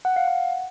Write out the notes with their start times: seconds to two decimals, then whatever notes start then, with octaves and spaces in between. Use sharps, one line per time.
0.05 F#5
0.16 F5
0.28 F#5